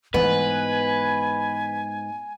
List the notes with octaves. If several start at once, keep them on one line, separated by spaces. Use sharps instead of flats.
G#2 E3 B3 B4 G#5